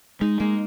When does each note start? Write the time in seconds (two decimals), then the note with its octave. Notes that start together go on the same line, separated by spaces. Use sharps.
0.21 G#3 D#4
0.40 G#3 A#3